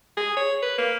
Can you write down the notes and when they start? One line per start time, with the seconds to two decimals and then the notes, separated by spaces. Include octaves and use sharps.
0.17 G#4
0.37 C#5
0.62 B4
0.78 A#3